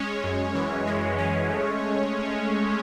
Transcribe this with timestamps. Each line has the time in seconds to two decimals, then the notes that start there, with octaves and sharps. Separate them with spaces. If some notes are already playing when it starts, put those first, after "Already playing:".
Already playing: G#3 C#4 C#5
0.24 F#2
0.55 E3
0.87 G#3
1.18 C#4
1.50 A3